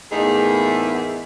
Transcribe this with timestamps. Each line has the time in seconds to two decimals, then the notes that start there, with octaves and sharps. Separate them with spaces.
0.11 E2 A2 A#3 D#4 G#4 E5